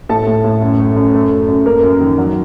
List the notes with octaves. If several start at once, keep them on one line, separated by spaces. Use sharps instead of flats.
A2 A4 A5
A2
A2
F#2
A3
F#2
A3
F#2
F#2
F#2 A#3 A#4
F#2
D#3
F#3